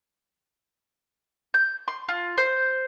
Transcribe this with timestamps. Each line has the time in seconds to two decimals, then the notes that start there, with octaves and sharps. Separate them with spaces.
1.54 G6
1.88 C6
2.09 F4
2.38 C5